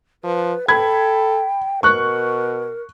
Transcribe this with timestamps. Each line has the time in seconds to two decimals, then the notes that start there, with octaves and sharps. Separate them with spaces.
0.24 F3 B4
0.68 A4 G5 B5 G#6
1.83 B2 A#4 C#6 F#6